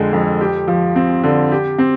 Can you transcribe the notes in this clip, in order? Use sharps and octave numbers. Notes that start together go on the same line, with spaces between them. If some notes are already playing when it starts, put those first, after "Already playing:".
Already playing: F2 D3 G#3
F2
G4
F3
C4
D3
G4
C4